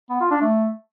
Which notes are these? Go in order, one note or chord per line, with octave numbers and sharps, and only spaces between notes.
B3
F4
D4
A3